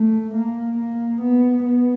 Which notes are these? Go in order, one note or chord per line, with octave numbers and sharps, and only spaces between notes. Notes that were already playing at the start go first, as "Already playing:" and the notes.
Already playing: A3
A#3
A#3
B3
B3